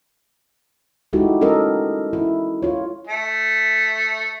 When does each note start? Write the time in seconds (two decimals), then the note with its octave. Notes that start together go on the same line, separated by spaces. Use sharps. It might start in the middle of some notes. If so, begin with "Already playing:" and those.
1.13 G#3 D#4 E4 F#4 G4 A4
1.41 C#4 A4 A#4 D#5
2.13 E4
2.62 F4 C#5
3.07 A3